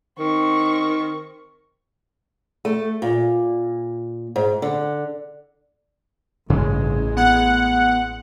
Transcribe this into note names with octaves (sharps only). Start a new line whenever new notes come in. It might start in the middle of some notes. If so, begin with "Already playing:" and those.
D#3 C4 C#6
A3
A#2
G#2
D3
A1 G2 C#3 G#3 C#4
B3 F#5